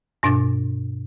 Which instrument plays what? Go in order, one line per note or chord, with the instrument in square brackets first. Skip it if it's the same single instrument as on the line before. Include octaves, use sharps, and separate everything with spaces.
[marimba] G2 B2 D4 D6 A6